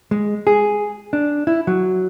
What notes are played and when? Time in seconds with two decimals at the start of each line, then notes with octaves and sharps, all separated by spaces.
0.11 G#3
0.47 G#4
1.13 D4
1.47 E4
1.67 F#3